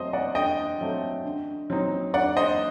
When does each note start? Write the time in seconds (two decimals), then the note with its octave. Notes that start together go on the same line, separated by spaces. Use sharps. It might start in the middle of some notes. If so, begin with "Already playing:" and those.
Already playing: F#3 A3 C4 C5 D#5
0.13 D5 F#5
0.35 D3 D#5 G5
0.81 F#3 A3 C4
1.25 D3
1.70 F#3 C4 D#4
2.14 D3 D5 F#5
2.37 C5 D#5